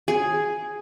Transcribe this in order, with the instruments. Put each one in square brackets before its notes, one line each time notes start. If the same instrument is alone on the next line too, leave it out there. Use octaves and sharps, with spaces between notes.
[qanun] G#4